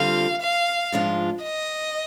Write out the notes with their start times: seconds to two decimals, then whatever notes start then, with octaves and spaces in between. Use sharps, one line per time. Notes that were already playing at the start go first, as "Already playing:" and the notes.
Already playing: D3 G3 C4 F4 F5
0.42 F5
0.92 G#2 F3 G#3 D4 F4
1.44 D#5